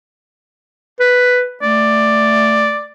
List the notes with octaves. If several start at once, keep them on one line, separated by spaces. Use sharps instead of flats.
B4
A3 D5